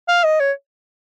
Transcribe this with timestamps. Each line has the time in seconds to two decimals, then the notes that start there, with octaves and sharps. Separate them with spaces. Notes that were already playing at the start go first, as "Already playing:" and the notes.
0.08 F5
0.24 D#5
0.40 C#5